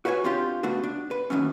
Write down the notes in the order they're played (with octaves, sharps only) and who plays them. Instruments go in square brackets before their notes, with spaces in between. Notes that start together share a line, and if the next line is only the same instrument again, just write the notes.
[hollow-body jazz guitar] F#4 B4 C#5 F5 G#5
C4 D4 F4 G4
C#2 A3 B3 D4 F#4
D4
B4
D#2 A2 C3 F#3 C#4